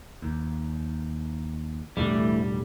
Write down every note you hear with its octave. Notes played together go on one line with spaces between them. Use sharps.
D#2
E1 A2 D3 E3 G3 A3